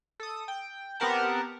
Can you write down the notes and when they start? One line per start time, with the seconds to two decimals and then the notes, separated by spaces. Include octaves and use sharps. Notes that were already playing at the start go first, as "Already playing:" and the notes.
0.20 A4 D#6
0.48 G5
1.00 B3 C4 G4 A#4 F#5 A5